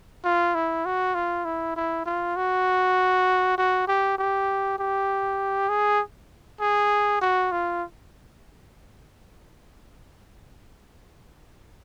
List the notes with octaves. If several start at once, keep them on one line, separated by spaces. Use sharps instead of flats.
F4
E4
F#4
F4
E4
E4
F4
F#4
F#4
G4
G4
G4
G#4
G#4
F#4
F4